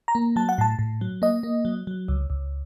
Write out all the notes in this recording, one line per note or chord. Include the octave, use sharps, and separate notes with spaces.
A#5
A#3
F#3 A5
F#5
A2 A5
A2
F#3
A#3 D#5
A#3
F#3
F#3
C#2
C#2